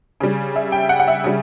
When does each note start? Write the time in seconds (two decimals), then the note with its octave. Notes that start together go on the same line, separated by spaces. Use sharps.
0.20 C#3 G3
0.56 E5
0.72 G5
0.89 F#5
1.00 F#5
1.08 E5
1.24 C#3 G3